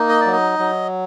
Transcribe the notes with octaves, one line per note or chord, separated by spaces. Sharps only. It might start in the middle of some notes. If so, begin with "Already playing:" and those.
Already playing: A#3 D#4
D#5
D5
F#3
D#5
F#3